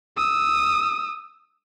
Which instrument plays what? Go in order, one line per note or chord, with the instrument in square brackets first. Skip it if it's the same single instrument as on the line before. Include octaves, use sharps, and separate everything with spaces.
[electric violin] D#6 E6